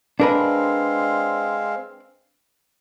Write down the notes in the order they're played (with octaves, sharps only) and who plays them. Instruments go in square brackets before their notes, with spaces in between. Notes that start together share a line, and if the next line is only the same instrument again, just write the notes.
[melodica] G#3 C4 F5 [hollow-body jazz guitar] D4 A#4 B4